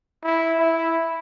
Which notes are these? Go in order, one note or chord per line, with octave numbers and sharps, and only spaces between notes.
E4
E4